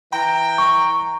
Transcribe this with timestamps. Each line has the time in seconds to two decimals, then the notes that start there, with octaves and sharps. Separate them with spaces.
0.13 E3 G5 A#5
0.58 C#6